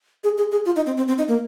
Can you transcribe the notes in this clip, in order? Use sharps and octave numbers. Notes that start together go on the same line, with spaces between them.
G#4
G#4
G#4
F4
D#4
C4
C4
C4
D#4
A#3